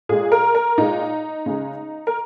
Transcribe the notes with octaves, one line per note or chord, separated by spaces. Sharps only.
A#2 G#3 G#4
A#4
A#4
A#2 G#3 D#4
C#3 G#3
A#4